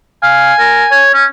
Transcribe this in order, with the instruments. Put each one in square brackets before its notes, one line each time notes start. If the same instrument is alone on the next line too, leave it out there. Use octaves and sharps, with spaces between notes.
[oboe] F5 [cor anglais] G#5
[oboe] A#4
C#5
C#4